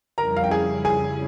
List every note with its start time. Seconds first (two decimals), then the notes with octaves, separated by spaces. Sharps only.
0.17 F2 C#3 G3 C#4 E4 A#4 A#5
0.37 F5
0.44 G5
0.51 G#4 G#5
0.85 G#4 G#5